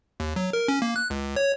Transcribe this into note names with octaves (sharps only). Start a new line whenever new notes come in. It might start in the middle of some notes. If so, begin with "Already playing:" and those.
D#2
F#3
A#4
C#4
A#3
F#6
C#2
C#5